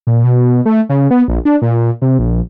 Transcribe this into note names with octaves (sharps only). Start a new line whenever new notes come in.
A#2
B2
A3
C#3
B3
A#1
D4
A#2
C3
A#1